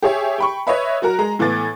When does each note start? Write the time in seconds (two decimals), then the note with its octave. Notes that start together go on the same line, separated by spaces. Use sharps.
0.02 G4 G#4 C#5 E5
0.38 G5 B5 C#6
0.67 B4 C#5 D#5 E5 B5
1.02 F#3 F#4 A#4 A#5
1.19 G#3 A#5
1.39 A2 E3 B3 D6 A6